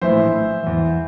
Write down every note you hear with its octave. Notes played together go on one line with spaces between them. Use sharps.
A#1 A2 E3 C5 E5
E2 E3